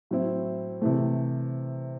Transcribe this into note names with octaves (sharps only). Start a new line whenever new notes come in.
A2 F#3 C4 E4
C3 E3 A3